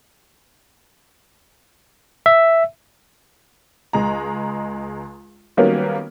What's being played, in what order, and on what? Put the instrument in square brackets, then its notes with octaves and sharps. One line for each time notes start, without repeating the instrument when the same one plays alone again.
[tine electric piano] E5
[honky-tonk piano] C#2 G#3 A#5
D#3 F#3 G3 A#3 B3 C#4